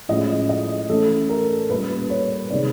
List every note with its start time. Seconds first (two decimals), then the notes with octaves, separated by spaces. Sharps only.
0.09 A2 F3 G#3 C#4 D#5
0.49 D#5
0.89 E3 A3 C#4 A4
1.29 A#4
1.70 A#2 G3 A#3 C#4 B4
2.10 C#5
2.50 C3 D#3 G#3 D5